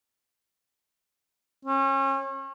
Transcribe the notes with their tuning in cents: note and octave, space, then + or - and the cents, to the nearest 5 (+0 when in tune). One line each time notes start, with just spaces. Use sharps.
C#4 -35